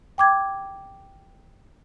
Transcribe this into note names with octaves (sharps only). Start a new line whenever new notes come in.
G5 D6 G#6